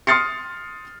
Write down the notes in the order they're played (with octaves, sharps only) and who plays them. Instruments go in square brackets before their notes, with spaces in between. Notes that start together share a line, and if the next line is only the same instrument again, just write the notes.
[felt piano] C6 D#6 F6 A6 C7 C#7